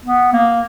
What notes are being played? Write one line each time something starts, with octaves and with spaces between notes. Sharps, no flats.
B3
A#3